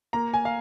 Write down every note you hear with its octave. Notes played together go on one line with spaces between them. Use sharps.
A#3 A#5
G#5
F5